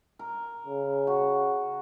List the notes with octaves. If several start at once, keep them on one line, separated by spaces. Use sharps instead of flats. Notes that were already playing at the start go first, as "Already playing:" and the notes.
A#4
C#3
F#4